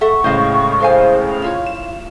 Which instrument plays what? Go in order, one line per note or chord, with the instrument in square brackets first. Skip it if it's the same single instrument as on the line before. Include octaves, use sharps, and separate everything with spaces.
[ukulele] A4 E5 F#5 [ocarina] C#6
[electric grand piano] A2 C#3 G#3 [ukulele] C5 D#5 F5
[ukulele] A4 F5 G#5 [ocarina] C5
[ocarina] F5
[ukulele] E4 F4 C#5
[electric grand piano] E7